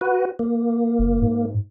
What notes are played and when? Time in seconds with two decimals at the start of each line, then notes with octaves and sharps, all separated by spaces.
0.01 F#4 B4
0.39 A#3
0.99 F#1
1.22 G#2